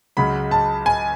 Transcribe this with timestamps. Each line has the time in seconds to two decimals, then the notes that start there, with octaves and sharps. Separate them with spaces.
0.17 C#2 C#3 F#3 B5
0.51 A5
0.86 G#5